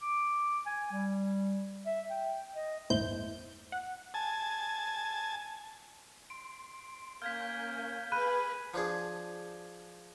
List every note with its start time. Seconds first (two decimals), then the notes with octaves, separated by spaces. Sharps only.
0.02 D6
0.66 G#5
0.92 G3
1.86 E5
2.10 G5
2.55 D#5
2.90 G1 E2 A2 E4 C5 G6
3.72 F#5
4.14 G#5 A5
6.30 C6 D7
7.22 A#3 C#4 F5 F6 G6 G#6 B6
8.12 G#4 B4 B5 F#6 D#7
8.74 F3 D4 G#4